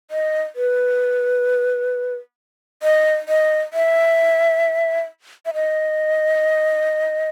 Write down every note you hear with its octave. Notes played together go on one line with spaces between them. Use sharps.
D#5
B4
D#5
D#5
E5
E5
D#5